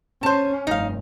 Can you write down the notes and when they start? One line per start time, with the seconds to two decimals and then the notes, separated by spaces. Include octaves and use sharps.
0.23 C#4 C5 A5
0.67 F1 G2 D#4 F5